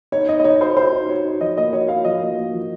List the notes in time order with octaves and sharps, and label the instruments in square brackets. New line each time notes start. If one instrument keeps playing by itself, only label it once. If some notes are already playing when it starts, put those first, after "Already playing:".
[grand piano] D#4 [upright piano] C#5
[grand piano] D#4 [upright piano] D#5
[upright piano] D#5
[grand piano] D#4 [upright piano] C#5
[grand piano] F#4 [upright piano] C5
[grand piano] F#4 [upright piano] C5
[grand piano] D#4
[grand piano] F#4 [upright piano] C#5
[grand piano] D#4
[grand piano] F3 [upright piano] D#5
[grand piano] A#3 [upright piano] D#5
[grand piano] F#4 [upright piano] C#5
[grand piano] F#4 [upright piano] F5
[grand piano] F3 [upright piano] D#5
[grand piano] A#3
A#3
F3